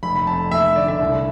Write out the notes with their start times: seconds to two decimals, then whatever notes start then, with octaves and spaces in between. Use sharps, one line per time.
0.03 F1 B5
0.16 B5
0.27 F2 A5
0.51 F1 E5
0.75 D3 D5
0.88 E5
1.01 C2